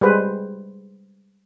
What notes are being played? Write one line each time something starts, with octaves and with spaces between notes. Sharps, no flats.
G3 G#3 B4 C5